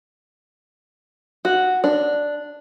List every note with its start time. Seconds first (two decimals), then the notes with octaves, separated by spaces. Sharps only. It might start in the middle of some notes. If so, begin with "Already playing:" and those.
1.45 F#4
1.84 D4